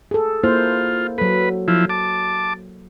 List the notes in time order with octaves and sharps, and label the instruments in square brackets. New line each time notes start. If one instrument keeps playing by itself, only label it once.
[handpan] G#4 A4
[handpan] A#3 E4 C5 [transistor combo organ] F4
[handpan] F#3 A4 [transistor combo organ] B4
[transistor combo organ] F3 E4
A5 D6